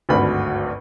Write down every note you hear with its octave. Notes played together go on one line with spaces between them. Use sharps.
G#1 D2 G2 B5